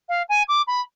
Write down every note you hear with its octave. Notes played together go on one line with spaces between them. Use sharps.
F5
G#5
D6
B5